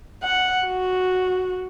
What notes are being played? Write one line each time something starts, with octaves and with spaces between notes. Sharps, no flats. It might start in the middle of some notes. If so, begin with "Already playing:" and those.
F#5
F#4